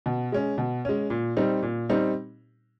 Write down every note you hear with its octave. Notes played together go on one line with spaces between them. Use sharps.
B2
G#3 C#4
B2
G#3 C#4
A#2
G3 C4 D#4
A#2
G3 C4 D#4